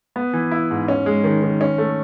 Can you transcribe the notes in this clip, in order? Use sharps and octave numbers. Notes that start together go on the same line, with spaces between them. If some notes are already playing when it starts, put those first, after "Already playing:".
B3
E3
E4
G#2
C#4
G#3
D#3
D#3
C#4
A3